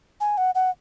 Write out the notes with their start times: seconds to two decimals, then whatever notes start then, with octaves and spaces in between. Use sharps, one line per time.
0.21 G#5
0.38 F#5
0.55 F#5